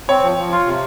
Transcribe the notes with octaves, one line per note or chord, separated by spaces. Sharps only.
C4 C#5
F3
F3
F4
C3